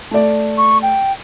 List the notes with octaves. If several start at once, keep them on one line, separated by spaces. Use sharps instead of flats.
A3 D5
C#6
G5